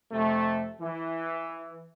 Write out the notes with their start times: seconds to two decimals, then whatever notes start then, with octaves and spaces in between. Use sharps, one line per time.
0.11 F2 C3 A3
0.80 E3